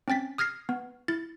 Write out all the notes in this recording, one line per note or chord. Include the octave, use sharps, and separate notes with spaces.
C4 C#4 G5 A6 B6
D#6 F6 G#6 A#6 C7
B3
E4 A6